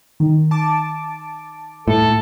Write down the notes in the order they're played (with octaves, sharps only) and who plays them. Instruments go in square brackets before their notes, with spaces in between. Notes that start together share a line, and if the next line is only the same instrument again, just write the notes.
[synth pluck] D#3
A5 D6
[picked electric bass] A2 [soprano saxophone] A4